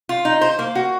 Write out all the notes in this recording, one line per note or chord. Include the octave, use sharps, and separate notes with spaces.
F4
D#4
C5
A#3
F#4